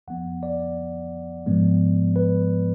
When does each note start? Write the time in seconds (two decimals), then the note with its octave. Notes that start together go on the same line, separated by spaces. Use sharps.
0.08 F2 F3 B3 F#5
0.43 D5
1.46 G#2 F3 G#3 B3
2.16 B4